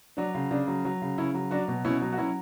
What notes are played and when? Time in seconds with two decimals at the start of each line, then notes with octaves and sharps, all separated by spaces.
0.17 F#3 D4
0.35 C#3
0.51 C#3 D4
0.68 F#3
0.85 F#3
1.02 C#3
1.18 C#3 C#4 E4
1.34 F#3
1.51 F#3 D4 F#4
1.68 B2
1.85 B2 C#4 E4
2.02 F#3
2.12 F#4
2.18 F#3 C#4 E4